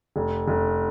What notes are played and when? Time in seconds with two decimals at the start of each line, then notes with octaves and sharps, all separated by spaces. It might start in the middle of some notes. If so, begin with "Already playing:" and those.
0.16 F1
0.48 F1